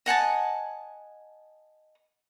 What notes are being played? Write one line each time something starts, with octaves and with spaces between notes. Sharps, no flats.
D#5 F#5 G#5 A5